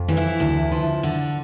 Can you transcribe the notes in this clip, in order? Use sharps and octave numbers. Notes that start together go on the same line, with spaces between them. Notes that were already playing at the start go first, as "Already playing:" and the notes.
Already playing: F2
E3
E4
D2
F3
D3